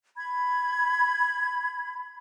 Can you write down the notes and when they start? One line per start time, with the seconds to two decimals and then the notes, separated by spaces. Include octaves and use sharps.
0.17 B5 G#6